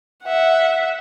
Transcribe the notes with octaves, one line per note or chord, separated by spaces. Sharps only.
E5 F#5